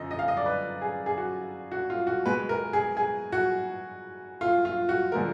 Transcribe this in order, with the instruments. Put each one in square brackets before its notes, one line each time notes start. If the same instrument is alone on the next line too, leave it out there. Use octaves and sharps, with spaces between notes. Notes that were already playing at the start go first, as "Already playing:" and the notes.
Already playing: [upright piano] F#2 D3 F3 D#5
D#5
F5
D#5
D5
B4
G#4
G#4
F#4
F#4
F4
F#4
B2 G#3 B3 B4
A#4
G#4
G#4
F#4
F4
F4
F#4
D3 F3 G#3 A#4